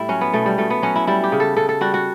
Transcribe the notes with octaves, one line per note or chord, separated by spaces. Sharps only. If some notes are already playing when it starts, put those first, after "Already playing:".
Already playing: A2 G3 E4
F#3 C#4
B3
B2 A3
G3
B2 A3
B3
F#3 C#4
E4
G3 E4
G4
C#3
A4
C#3 A4
A4
G3 F#4
F#4